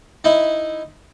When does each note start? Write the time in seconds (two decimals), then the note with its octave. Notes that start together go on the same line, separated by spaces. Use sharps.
0.24 D#4 E4